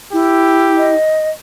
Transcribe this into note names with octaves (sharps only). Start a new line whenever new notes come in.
E4 G4
D#5